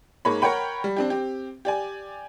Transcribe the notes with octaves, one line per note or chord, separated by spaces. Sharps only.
G#2 A#3 C#5 B5
A#4 C#5 F#5 G5 B5
G3
C4 D4 G4
C4 G4
G4 D5 G#5